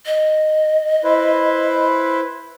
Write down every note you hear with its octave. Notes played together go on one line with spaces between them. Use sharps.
D#5
E4 B4 C5